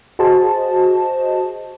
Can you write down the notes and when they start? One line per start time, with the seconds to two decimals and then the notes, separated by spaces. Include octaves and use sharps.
0.19 F#4 G#4 C5 D#5 A5